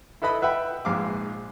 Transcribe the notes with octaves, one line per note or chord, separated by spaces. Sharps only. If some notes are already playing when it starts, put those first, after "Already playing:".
E4 A4 B4 D#5 B5 D#6
B4 E5 F#5 G5 B5
A#1 G#2 F5 D6